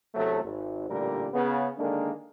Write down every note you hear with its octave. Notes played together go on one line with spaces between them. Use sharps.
E2 C3 F#3 A3
G#1
A1 A#2 D3 G3 A#4
C#3 B3
D3 D#3 G#3 A#3 D4